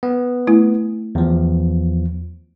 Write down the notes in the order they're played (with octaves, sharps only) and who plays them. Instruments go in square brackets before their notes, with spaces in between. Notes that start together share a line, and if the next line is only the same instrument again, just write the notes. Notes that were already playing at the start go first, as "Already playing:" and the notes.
[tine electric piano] B3
[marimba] A3 E4
[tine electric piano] E2 F3